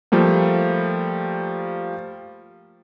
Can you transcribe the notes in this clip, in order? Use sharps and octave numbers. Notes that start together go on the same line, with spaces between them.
F3 G3 A3 A#3